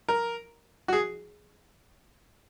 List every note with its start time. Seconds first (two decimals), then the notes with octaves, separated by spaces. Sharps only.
0.09 A#4
0.88 F#4
0.93 G#4